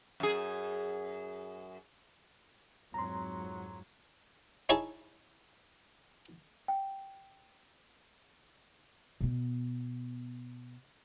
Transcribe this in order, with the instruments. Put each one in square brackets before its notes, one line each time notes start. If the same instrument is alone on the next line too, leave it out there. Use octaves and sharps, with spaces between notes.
[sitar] F#2 G#4
[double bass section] F2 G#2 F#3 [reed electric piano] A#5 C6
[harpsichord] D#4 E4 G#4 C#5 G#5 A5
[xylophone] G5
[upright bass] B2 B3